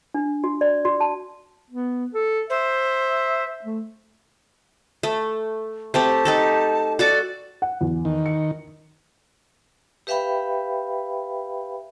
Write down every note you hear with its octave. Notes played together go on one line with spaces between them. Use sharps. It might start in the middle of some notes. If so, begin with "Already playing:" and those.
D4
F#4
D5
F#4
A5
B3
A4
C5 E5
A3
A3
A3 C4 G4 A5
D#4 G4 A4
F#4 A4 D5 D6
F#5
E2
D#3
C#7
G4 B4 E5 F5 G5 B5